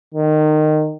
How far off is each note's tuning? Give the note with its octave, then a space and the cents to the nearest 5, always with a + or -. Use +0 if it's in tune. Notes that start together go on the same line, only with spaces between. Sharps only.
D#3 -20